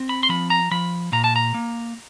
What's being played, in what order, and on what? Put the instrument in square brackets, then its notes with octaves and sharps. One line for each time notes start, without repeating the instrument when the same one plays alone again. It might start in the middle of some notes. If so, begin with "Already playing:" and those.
Already playing: [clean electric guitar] C4
B5
C6
F3 B5
A#5
F3 B5
A#2 A#5
A5
A#5
A#3